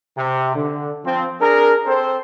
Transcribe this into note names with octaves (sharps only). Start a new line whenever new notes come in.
C3
D3
F3 C4
D4 G#4 A#4
C4 A4 C5